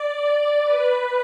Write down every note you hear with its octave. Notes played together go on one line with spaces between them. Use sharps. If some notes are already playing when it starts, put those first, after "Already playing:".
Already playing: D5
B4